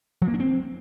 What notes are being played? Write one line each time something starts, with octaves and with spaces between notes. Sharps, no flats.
F3
A#3
D4
C4